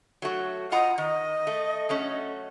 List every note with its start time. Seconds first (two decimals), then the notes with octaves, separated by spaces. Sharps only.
0.22 F#3 A3 F#4
0.72 F4 D#5 F#5 A#5
0.98 D#3 D#5
1.47 A3
1.89 F#3 A3 C#4